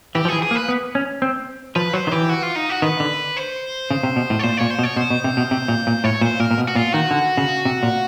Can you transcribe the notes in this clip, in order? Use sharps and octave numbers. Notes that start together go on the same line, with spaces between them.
E3 G4
F3
E3 G#4
G#4
A#3
B4
B3
C#4
C4
F3 B4
F#3 C5
D#3
E3 G4
F#4
F4
D#4
F#4
D#3 B4
D3
C5
C#3
C3
B2
A2
C#5
A#2 C5
A#2 C#5
C5
B2
C#5
B2 C5
B2
C3
B2
C3
A#2
A#2
A2 C#5
A#2 C5
A#2 A#4
A#2
B2
F#4
A#2 F4
D#3 F#4
D3
C#3
C3
A#2